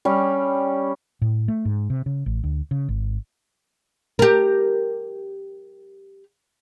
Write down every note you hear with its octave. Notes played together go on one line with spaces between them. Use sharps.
G3 C#4
A2
A3
G#2
C3
C#3
A1
D2
C#3
G#1
G4 A#4